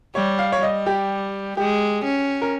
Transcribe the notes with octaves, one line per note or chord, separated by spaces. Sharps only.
G3 C#5
F5
C#5
G3 D#5
G4
G#3 G4
C#4
A#4